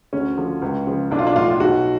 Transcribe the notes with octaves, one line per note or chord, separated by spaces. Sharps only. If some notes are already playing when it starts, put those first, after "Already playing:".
D2 C#4
D3 F3
C#2
C#3 F3
B1 D4
F4
D4
A2 F3 F4
F4
B1 F#4